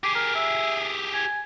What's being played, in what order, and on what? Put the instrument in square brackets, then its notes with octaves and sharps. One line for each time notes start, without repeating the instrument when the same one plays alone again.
[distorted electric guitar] G4 G#4 [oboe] D6
[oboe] A#4
E5
G#5